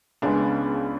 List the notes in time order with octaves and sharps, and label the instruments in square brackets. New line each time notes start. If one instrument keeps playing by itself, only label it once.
[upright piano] C#2 C#3 G#3 B3 D4